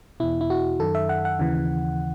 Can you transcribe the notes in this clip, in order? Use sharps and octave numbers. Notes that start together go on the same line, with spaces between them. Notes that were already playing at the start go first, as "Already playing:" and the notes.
E2 B2 E4
E4
F#4
F#2 D#3 A4
E5
F#5
F#5
D#2 C#3 E3